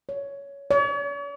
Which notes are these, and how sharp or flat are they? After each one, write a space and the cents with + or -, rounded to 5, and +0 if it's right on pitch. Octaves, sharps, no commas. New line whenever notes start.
C#5 +15
C#5 +45